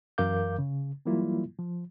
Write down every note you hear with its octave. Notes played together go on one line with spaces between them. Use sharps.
F#2 E3 A#4 F5 D6 G6
C#3
E3 F#3 G3 A#3 E4 F4
F3